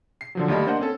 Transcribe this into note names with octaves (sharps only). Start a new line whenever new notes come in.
C7
D3 F3 F#3
D#2 G3 A3 D#5 B5
A#3 D4 A#4 C5 D#5 F#5
C4 C#4 A4